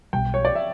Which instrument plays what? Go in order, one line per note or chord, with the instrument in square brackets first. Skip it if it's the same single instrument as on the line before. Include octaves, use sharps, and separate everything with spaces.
[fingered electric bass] B1 B2 G3 [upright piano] G5
[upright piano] C#5
D5
E5